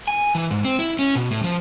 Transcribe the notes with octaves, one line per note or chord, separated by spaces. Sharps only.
G#5
E3
G#2
C4
E4
C#4
B2
A2
F3